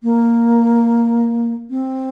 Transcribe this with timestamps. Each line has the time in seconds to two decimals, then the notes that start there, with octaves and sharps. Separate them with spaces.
0.03 A#3
1.70 C4